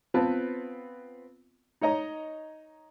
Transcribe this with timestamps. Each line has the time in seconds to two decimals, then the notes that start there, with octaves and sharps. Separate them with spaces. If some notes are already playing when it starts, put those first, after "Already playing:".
0.14 B3 C4 F4 B4 A5
1.81 D#4 C#5 D#5 A#5